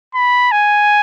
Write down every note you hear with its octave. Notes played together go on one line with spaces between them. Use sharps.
B5
G#5